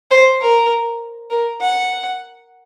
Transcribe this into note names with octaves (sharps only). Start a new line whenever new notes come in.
C5
A#4
A#4
F#5